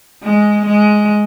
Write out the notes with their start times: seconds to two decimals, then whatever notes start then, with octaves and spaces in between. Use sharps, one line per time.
0.24 G#3
0.65 G#3